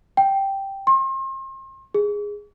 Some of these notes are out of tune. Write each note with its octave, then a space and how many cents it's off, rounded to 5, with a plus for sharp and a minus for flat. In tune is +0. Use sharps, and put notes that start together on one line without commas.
G5 -5
C6 +40
G#4 -10